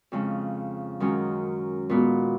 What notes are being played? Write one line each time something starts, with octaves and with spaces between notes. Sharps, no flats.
F2 C#3 G#3
F#2 D#3 G#3 C#4
A#2 G#3 B3 F#4